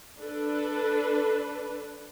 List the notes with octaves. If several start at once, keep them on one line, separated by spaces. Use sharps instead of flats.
D4 A4 B4